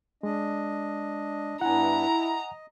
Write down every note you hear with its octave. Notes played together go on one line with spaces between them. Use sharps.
G#3 D4 D#5
G2 B3 D4 E4 F#5 G#5 A#5
D#5